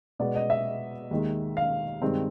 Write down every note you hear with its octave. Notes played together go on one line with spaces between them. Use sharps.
B2 G#3 B3 D5
D#5
E5
D#2 D#3 G#3
F5
G2 D#3 G#3 C4